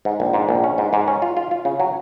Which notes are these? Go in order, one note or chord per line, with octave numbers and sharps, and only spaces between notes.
G#2
A#1
G#2
A#1
C#4
G#2
G#2
C#4
F4
F4
F4
C#3
F#3